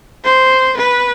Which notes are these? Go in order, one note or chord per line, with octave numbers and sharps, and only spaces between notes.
C5
B4